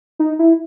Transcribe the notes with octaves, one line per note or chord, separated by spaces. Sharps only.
D#4
E4